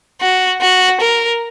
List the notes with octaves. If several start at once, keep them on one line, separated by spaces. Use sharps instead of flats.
F#4
F#4
A#4